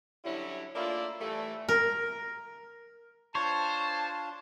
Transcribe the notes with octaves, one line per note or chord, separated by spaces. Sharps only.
D3 F#3 G3 C#4 E4
A3 A#3 D4 E4 F4 D5
A2 E3 G3 A3
A#4
D4 F4 C5 C#5 A5